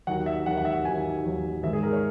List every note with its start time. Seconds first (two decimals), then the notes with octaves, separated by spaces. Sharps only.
0.07 D#2 D#3 F#3 F#5
0.26 E5
0.46 D#2 D#3 F#3 F#5
0.57 F#5
0.65 E5
0.85 D#2 D#3 F#3 G#5
1.24 D#2 D#3 F#3
1.63 G#2 D#3 G#3 E5
1.73 G#4
1.83 A#4
1.93 C#5